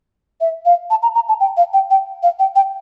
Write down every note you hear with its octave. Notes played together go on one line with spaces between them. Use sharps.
E5
F5
A5
A#5
A#5
A5
G5
F5
G5
G5
F5
G5
G5